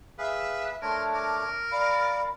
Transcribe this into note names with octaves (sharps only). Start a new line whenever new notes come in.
G#4 B4 E5 F5
A3 D4 A#4 C#5 C6
A#4 D6
D5 F5 B5